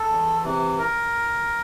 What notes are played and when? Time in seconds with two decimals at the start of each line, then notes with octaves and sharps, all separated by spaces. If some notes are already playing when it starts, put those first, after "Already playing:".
Already playing: A4
0.09 E2
0.43 C3 E3
0.78 A#4